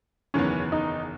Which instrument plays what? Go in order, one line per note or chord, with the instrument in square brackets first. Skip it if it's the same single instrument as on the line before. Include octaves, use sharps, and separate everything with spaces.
[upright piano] F#1 E2 D#3 F#3 B3 [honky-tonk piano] C#4
[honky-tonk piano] D#4